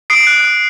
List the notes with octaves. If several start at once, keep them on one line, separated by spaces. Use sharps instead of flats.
D#6 C7 D7
F#6
D#6